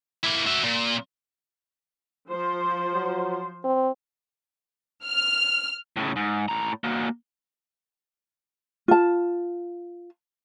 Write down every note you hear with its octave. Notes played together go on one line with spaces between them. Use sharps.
A#3 E4
F#4 E5
A#2
F3 C5
F#3
C4
F6
A2 C#3
G#2
A2 A#5
A#3 F#4
F4 A5